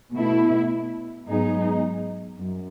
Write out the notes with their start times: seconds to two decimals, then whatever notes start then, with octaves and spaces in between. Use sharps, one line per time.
0.13 B2 A3 E4
1.26 G#2 F#3 B3 D#4 G#4
2.39 F#2